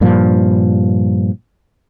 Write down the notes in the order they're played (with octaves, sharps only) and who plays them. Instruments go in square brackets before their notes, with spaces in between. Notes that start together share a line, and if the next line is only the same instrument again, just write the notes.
[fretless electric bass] G2 A#2 F3